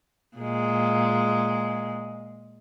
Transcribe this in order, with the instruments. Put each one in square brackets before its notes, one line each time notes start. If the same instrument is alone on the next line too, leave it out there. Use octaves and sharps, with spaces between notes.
[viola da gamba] A#2 G#3